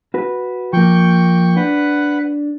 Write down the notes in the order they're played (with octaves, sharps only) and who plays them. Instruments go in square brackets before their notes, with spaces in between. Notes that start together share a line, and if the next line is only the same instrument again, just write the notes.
[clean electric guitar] F#4 B4
[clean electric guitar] F3 A#3 [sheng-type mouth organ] G5 C#6
[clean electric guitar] D4 [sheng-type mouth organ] B4 F#5